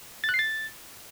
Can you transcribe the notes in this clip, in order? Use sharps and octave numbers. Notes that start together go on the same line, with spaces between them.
A6
F#6
C7
A6